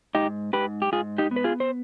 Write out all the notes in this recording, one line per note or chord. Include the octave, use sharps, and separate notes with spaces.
G#2 D#4 G4
G#2 G4 B4
G4
G#2 F4 G#4
D#4 G4
B3
B4
F4 G#4
C5